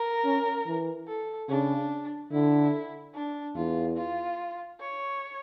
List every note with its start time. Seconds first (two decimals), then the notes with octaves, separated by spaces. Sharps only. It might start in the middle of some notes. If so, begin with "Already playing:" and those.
Already playing: A#4
0.25 C#4
0.66 E3
1.08 A4
1.49 C#3 D4
2.31 D3 E4
3.15 D4
3.56 E2 F4
3.97 F4
4.80 C#5